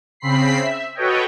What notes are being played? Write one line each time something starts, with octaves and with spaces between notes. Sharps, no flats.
C#3 C4 B5 B6 C7
E5
F#4 A4 B4 C#5 D#5 G5